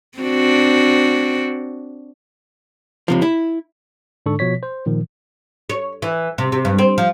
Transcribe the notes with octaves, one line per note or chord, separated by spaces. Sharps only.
C4 D4 F#4
C#2 C3 F3
E4
G#2 D3 D4 A4 C#6
B2 F3 C#5 B6
C5
A#2 D#3 F3
C#5
E3
C3
C3
G2
C4
F3